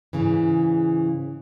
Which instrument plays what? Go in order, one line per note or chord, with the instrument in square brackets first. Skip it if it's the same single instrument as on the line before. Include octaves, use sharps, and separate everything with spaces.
[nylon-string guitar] G#2 C#3 E3